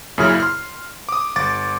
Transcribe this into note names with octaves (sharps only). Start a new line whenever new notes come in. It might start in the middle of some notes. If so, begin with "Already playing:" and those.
F#2 A#2 C#3 E4 G#4 F6
C6 F6
D6 D#6
G1 D6 A6